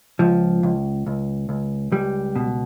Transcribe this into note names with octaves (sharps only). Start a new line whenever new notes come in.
C#2 F3
C#2
C#2
C#2
C#2 G3
B2